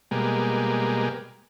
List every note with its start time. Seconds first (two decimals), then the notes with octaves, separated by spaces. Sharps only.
0.11 B2 G3 G#3 A#3